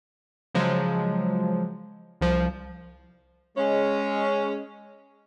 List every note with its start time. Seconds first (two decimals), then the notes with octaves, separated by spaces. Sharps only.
0.55 C#3 F3 F#3 G#3
2.21 C2 F3
3.57 G#3 C#4